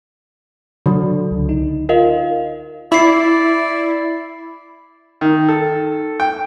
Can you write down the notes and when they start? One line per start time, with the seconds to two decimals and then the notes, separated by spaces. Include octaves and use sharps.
0.86 D3 F#3
1.31 C#2
1.49 D#4
1.89 F4 A#4 D#5 F5
2.92 E4 D5 B5 C7
5.21 D#3
5.49 A4
6.20 G5